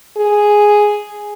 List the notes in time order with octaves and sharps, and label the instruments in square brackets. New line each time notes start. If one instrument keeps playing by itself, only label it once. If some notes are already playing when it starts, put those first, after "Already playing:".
[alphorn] G#4